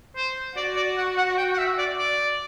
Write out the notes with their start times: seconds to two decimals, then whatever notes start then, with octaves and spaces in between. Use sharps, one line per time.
0.16 C5
0.57 F#4 D5
0.76 D5
0.97 F#5
1.17 F#5
1.38 G5
1.54 F#5
1.58 E5
1.78 D5
1.98 D5